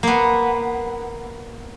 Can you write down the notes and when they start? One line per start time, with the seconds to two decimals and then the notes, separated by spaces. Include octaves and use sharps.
0.03 A#3 B3